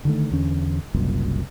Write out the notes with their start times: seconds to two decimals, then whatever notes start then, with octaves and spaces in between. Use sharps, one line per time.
0.05 D3 D#3 A3
0.32 E2 D3 C#4
0.94 F#1 C2 F#2 A#2